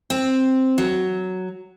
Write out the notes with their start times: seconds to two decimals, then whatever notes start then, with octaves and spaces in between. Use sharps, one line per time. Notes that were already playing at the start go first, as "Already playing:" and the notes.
0.10 C4
0.78 F#3